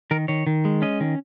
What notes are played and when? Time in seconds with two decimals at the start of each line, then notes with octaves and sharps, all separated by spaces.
0.11 D#3 A#4
0.28 D#3 C#5
0.47 D#3
0.65 G#3
0.82 C#4 D#5
1.00 D#3